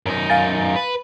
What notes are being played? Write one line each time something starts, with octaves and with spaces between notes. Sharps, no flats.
F#2 D#4
F5 G#5 A6
B4